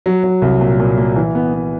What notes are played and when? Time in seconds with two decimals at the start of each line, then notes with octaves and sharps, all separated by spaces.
0.06 F#3
0.24 F#3
0.42 C2
0.61 A#2
0.79 A#2
0.98 A#3
1.16 E3
1.35 B3
1.54 B3